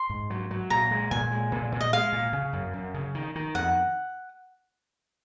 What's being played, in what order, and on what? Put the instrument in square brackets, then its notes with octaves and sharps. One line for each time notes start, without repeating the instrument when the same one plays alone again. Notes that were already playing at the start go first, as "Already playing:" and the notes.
Already playing: [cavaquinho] C6
[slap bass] G#2
F#3
F#3
[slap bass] A#2 [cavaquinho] A#5
[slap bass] G#3
[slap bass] A#2 [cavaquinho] G#5
[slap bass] G#3
A#2
A#2
[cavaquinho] D#5
[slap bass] G#3 [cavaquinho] F5
[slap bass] A#2
C#3
F#2
F#2
C#3
D#3
D#3
[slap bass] F2 [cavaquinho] F#5